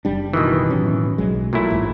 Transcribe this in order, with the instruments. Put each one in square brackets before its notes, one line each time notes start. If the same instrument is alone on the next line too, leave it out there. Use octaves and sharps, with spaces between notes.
[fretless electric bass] F#1 G3 D4
[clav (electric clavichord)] B2 D#3 E3
[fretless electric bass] A2 F#3 C#4
B1 F#3 G#3
[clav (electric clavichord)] A#2 F#3 E4 [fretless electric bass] A3
[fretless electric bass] A1 G#2